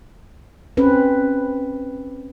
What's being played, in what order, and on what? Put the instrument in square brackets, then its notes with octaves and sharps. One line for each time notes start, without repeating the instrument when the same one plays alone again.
[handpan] C4 C#4 B4